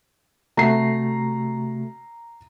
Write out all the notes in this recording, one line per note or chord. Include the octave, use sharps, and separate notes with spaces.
C3 A3 F#4 A#5 C7